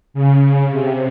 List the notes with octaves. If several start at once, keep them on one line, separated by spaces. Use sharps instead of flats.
C#3
C3